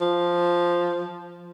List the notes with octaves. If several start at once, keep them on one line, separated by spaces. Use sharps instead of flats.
F3